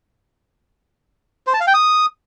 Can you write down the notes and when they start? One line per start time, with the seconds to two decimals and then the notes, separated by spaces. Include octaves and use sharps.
1.47 C5
1.54 A5
1.60 F5
1.67 G5
1.74 D#6